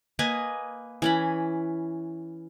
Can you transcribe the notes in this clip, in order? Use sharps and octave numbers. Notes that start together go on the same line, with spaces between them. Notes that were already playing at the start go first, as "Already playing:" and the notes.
A#3 B4 D#5 G#5
E3 C#4 B5